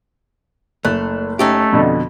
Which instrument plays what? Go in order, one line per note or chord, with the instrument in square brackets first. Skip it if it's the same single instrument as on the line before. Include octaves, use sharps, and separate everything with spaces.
[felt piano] F#1 F#6 [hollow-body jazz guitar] A3
[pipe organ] A3 [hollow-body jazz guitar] C#4 D#4 G4
[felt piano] F2 B2 D3